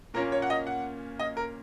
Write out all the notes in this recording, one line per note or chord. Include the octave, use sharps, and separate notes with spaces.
A#2 A#3 C#4 A#4
C#5
F#5
D#5
F#5
D#5
A#4